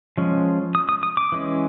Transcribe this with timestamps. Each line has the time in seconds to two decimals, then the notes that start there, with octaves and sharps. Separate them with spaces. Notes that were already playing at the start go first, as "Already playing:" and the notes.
0.17 F3 G#3 C#4
0.75 D#6
0.89 D#6
1.03 D#6
1.17 D6
1.32 E3 G#3 C#4